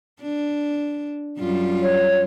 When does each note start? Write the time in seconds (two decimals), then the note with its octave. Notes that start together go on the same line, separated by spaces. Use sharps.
0.22 D4
1.39 F#2 G3 F4
1.82 C#5